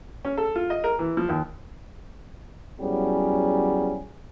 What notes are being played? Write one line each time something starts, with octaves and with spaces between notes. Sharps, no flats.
C#4
A4
F4
D#5
A#4
E3
F3
D#2
F#3 G3 B3 C#4 E4 G#4